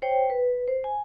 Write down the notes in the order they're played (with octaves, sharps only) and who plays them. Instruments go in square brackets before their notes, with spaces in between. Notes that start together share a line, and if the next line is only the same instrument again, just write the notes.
[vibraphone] C5 C#5 G5
B4
C5
G#5